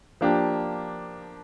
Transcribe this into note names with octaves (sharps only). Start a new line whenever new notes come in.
F3 A#3 D4 G4